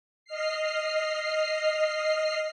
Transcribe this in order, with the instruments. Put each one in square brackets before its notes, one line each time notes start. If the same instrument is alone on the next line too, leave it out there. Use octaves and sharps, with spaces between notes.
[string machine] D#5 F6 C7